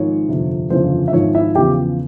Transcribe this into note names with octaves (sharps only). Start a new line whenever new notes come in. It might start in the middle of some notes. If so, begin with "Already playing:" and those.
Already playing: G#1 G#2 F3 C#5
G1 F2 C3
G1 F2 C#3 E3 C5
E5
G#1 G#2 F3 C#5
E4 E5
E2 C#3 F3 G4 G5